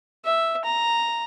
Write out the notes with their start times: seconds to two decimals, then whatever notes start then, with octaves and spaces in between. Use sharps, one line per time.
0.25 E5
0.65 A#5